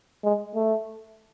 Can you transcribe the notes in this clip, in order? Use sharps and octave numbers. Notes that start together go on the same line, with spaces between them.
G#3
A3